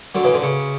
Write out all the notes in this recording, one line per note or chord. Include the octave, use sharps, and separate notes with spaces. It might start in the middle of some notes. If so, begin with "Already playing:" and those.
D3 F#3
C#3 E3
D3
C#3